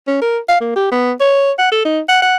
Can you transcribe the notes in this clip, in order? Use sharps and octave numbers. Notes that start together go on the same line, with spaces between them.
C#4
A#4
F5
A#3
G4
B3
C#5
F#5
A4
D#4
F#5
F#5